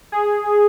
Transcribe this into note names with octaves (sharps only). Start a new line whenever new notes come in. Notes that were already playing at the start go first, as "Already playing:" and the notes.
G#4